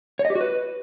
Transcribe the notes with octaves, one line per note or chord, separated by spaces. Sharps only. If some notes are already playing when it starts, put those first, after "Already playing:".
C#5
D#5
G4
F#4
B4